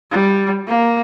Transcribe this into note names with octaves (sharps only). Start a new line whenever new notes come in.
G3
A#3